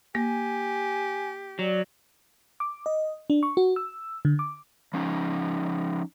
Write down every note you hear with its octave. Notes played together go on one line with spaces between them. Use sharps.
A#3 G4 G#5
F#3 D5
D6
D#5
D4
C#6
F#4
E6
D3
D6
F3 C#4 D#4